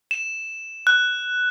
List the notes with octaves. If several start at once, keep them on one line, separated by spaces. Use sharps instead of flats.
E7
F#6